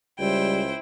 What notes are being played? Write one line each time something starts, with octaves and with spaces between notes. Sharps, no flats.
C#2 G3 E4 C5 G5